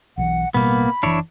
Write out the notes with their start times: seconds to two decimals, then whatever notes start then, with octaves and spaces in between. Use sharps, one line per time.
0.18 B1 D#3 E3 F#5
0.54 A1 B2 G3 A#3 B3 B5
1.03 F#1 E3 D4 E4 C#5